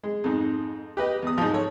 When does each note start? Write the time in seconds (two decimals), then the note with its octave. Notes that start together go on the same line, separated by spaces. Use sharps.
0.04 G#3
0.24 F2 G#2
0.97 G4 B4 D#5
1.22 E2 D#6
1.38 G#2 F3
1.53 A4 C#5